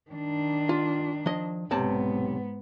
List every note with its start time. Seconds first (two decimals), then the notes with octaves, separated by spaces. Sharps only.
0.11 D#3 D4
0.69 F4
1.26 F3 D#5
1.71 B1 G#2 C3 B3 A5